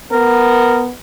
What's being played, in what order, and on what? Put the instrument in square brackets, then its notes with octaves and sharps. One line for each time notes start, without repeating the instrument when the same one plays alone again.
[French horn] B3 [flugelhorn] A#4